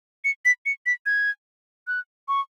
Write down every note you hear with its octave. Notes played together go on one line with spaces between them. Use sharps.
C#7
B6
C#7
B6
G#6
F#6
C#6